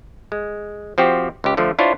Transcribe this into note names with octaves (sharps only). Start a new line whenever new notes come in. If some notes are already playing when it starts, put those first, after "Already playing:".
G#3
F3 C4 F#4 G4
C#2 G4
D3 F3 A3
D4 E4 F4 C5 C#5